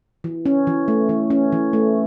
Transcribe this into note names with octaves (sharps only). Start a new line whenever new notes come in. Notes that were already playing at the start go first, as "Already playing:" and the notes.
E3
C#4
E3
A3
E3
C#4
E3
A3